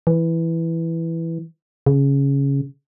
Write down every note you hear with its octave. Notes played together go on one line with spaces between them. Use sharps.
E3
C#3